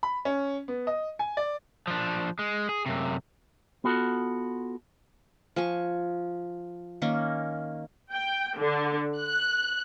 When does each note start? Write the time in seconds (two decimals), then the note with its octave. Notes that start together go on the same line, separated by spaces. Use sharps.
0.03 B5
0.25 C#4
0.68 B3
0.87 D#5
1.19 G#5
1.37 D5
1.87 F3 D4
2.39 G#3
2.69 G#4
2.86 F#2 C3
3.84 B3 F4 F#4 A4
5.56 F3 G#5 C#6
7.02 D#3 A#3 C#4
8.12 G5
8.59 D3
9.18 F#6